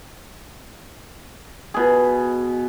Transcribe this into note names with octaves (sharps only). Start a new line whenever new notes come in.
B2 G#4